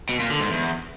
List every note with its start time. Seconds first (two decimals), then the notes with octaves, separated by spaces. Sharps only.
0.09 B2
0.19 A#2
0.30 D3
0.40 G#2
0.51 E2